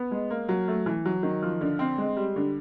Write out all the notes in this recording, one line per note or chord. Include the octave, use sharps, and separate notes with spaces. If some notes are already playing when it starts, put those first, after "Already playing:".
Already playing: B3
G#3
A#3
F#3
A3
E3
F#3
D#3
F3
D3
C4
G#3
G3
D3